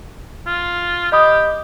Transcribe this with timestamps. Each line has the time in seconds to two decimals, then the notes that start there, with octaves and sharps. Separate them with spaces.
0.47 F4
1.12 G4 D#5 B5 D#6